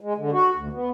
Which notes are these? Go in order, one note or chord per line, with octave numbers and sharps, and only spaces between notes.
G#3
D3
F#4
D2
B3